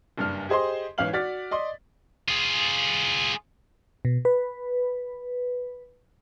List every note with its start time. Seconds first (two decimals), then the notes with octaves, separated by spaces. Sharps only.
0.18 F#1 G2 D4 F6
0.49 G4 G#4 C5 D#5 C6
0.98 G#1 E3 C#4 F5 F6 F#7
1.13 F#4 D5 F6 A6 B6
1.51 D5 D#5 C6
2.28 F4 G#4
4.05 B2
4.25 B4